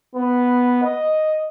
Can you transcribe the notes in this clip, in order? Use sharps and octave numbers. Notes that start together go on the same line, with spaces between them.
B3
D#5